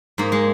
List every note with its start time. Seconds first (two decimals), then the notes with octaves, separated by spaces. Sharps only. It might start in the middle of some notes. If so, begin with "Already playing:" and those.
0.18 G#2 A#3
0.32 G#3